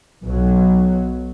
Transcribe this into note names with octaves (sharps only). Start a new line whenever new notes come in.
B1 B2 F#3